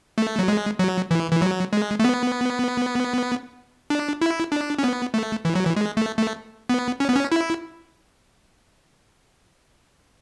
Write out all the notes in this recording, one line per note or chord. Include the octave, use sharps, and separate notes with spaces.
A3
F#3
G#3
F#3
E3
E3
F#3
G#3
A3
B3
D4
E4
D4
C#4
B3
A3
E3
F#3
E3
G#3
A3
A3
B3
C#4
B3
C#4
E4